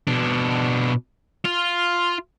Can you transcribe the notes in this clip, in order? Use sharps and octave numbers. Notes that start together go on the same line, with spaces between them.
B2 D4
F4